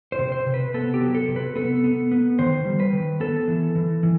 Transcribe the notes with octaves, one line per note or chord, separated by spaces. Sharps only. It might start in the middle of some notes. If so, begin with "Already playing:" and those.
C5
C3
C5
C3
B4
B3 A4
G4
F#3
A4
C3
B4
B3 A4
B3
B3
D#3 C5
G3
B4
D#3
B3 A4
E3
E3
E3